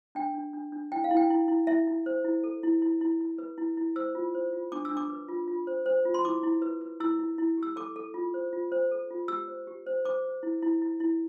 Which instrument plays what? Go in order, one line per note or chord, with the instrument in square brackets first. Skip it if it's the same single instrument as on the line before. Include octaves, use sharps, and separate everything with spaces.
[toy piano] D4 G5
D4
D4
D4
E4 G5
F5
E4
G5
E4
E4
E4 E5
E4
C5
E4
A4
E4
E4
E4
E4
B4
E4
E4
C5 E6
F4
C5
F4
D4 D6
E6
D4
D6
B4
F4
F4
C5
C5
F4
C6
E4 D6
E4
B4
B4
E4 E6
E4
E4
G4
E6
A4 D6
A4
F4
C5
F4
C5
A4
F4
G4 E6
C5
G4
C5
C5 D6
C5
E4
E4
E4
E4